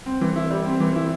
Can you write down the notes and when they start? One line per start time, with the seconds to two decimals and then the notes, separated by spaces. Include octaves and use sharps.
0.06 C4
0.21 E3
0.36 E4
0.51 G3
0.65 C4
0.80 E3
0.95 E4